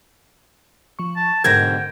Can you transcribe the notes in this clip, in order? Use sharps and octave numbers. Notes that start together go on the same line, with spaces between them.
F3 C#6
A5
G#2 B2 D3 A#4 G5 G#6 A#6